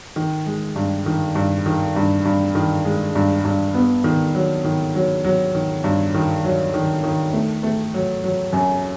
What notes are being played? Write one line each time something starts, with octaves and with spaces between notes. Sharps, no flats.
D#3
G#3
G2
D#3
G2
D#3
G2
G2
D#3
G#3
G2
G2
B3
D#3
F#3
D#3
F#3
F#3
D#3
G2
D#3
F#3
D#3
D#3
A3
A3
F#3
F#3
F#2